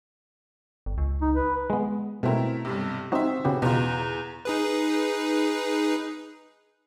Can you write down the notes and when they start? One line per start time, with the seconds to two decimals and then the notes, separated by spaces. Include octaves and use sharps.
0.86 G1
0.98 C#2
1.22 D#4
1.35 B4
1.70 G#3 B3
2.23 B2 A3 C4 E4 A#4
2.65 B1 G2 C3
3.12 C4 D#4 F#4 C5 E5
3.45 C#3 B3 F#4 G4
3.62 E2 B2 F4 A#5
4.45 D#4 G#4 B4